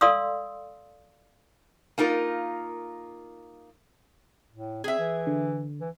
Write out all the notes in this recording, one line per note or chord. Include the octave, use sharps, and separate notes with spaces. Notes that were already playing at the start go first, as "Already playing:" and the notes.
A4 D5 F5 C6 D#6 E6
A#3 D#4 F4 A#4
A2
C4 G#4 E5 G#6
E3
D3
E3